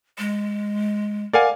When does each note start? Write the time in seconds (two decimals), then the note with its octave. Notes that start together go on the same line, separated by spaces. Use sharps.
0.18 G#3
1.33 A#4 D5 F5 F#5 G#5